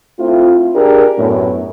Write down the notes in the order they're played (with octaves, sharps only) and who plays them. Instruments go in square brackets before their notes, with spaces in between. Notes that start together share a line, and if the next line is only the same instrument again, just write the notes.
[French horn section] A3 C4 E4 F4
D4 G4 G#4 A#4
F#2 A2 B3